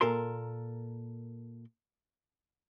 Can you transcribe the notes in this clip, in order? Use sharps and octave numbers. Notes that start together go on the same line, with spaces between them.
A#2 A4 A#4 C6